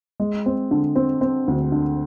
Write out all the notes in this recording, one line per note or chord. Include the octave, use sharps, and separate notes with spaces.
G#3
C4
D3
C4
C4
D2
D3